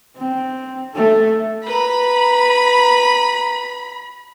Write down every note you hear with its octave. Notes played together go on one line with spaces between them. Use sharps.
C4
A3 A4
B4 A#5 B5